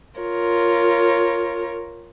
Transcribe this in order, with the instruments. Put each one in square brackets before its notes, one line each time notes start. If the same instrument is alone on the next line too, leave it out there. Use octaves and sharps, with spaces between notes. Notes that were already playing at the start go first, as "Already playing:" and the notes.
[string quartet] F4 A#4 C#5